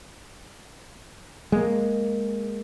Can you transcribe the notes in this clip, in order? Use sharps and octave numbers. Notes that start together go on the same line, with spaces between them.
G#3 A#3